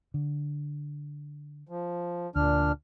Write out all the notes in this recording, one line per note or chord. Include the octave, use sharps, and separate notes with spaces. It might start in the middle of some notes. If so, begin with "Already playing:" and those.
D3
F3
D2 A#2 D4 F6